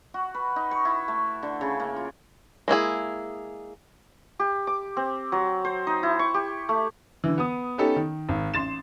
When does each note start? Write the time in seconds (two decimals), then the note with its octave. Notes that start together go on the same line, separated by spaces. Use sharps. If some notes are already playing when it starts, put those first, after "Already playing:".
0.14 F#4
0.34 B4
0.56 D#4
0.71 C#6
0.85 E4
1.08 A3
1.43 D3
1.61 C#3
1.79 A#3
1.96 F4
2.68 G#3 A#3 E4 G#4
4.39 G4
4.67 D6
4.97 C4
5.32 F#3
5.65 C5
5.87 D#4
6.03 E4
6.19 C#6
6.34 G4
6.69 A3
7.24 D3 E3
7.38 B3 D#6
7.78 B3 C#4 D#4 G4 A4
7.96 D#3
8.29 G#1
8.54 A1 C6 A6 E7